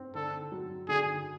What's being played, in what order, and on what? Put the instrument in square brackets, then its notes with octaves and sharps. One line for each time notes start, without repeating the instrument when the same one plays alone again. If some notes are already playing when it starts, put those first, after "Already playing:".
Already playing: [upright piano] C4
[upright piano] D3 [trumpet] A4
[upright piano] F#3
[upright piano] D3 [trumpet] G#4